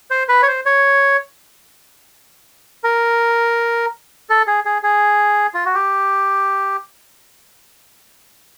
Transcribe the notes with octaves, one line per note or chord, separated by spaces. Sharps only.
C5
B4
C#5
C5
C#5
A#4
A4
G#4
G#4
G#4
F4
F#4
G4